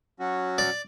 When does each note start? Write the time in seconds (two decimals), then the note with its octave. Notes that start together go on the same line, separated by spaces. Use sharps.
0.20 F#3 C#4 F#4
0.58 D5